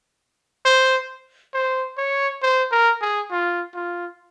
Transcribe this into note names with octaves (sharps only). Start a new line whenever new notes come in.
C5
C5
C#5
C5
A#4
G#4
F4
F4